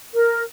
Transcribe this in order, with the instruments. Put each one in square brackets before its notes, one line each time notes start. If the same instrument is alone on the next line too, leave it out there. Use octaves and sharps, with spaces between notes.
[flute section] A#4